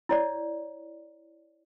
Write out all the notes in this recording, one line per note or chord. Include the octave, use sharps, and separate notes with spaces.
E4 C#5 D5